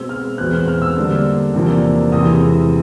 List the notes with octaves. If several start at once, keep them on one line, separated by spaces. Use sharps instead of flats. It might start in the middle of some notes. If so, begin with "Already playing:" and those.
Already playing: B2 G#3 C4 E6
F6
E2 B2 G#3 C4 F#6
F6
F6
E6
D3 G3 A#3 D4
E2 C3 F3 A#3 D4
E2 C3 E3 G#3 D#6